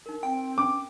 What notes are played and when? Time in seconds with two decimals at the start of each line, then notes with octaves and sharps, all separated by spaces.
0.06 D#4 A#4
0.23 C4 G5
0.58 C#4 D6